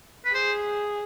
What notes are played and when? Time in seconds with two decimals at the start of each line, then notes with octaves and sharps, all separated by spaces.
0.25 B4
0.34 G#4 C5